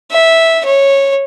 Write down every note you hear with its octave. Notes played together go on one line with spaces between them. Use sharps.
E5
C#5